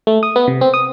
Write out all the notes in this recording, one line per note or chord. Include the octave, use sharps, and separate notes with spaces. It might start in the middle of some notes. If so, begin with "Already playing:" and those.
A3
D#6
B3
C3
C4
D#6